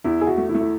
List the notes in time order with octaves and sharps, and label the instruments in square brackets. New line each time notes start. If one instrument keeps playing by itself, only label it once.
[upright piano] E2 [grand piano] E4
[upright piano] E4 [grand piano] G#4
[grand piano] F#4
[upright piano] A3
[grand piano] E4
[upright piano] A3
[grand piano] E4